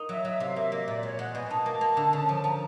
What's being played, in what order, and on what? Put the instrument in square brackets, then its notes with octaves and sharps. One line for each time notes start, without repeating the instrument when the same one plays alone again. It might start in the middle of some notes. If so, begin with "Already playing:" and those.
Already playing: [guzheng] A#3 D#4
[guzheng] F#3 [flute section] E5
[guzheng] F#3 [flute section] E5
[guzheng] C3 [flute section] F5
[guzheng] A#3 [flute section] E5
[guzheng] A#3 [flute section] D#5
[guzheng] A#2 [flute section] D5
[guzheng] G#3 [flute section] C#5
[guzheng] G#3 [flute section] F#5
[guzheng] B2 [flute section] G#5
[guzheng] D#4 [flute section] A5
[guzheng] A#3
A#3
D3
C#3
F3
[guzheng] F3 [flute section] A#5